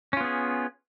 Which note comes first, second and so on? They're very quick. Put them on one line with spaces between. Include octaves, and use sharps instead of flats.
C#4 F4 B3 G#4